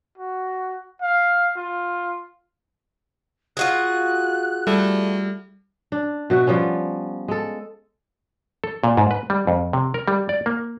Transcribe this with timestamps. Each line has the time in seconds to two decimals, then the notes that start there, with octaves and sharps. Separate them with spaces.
0.18 F#4
1.02 F5
1.57 F4
3.57 F4 F#4 G#4 F#6
4.67 G3 A3
5.92 D4
6.30 B2 F#4 E5 F#5
6.47 F3 G3 B3 C#4
7.28 G#3 A4
8.64 A4
8.84 A#2
8.97 G#2
9.11 B4
9.30 G3
9.47 F2
9.73 C3
9.94 A#4
10.08 G3
10.29 D5
10.46 A#3